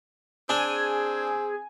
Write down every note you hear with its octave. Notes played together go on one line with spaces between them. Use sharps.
C4 D4 G#4 G#5